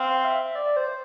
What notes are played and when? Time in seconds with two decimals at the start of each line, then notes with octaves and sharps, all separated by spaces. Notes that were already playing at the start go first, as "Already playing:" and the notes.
Already playing: C4 F5
0.24 E5
0.55 D5
0.77 C5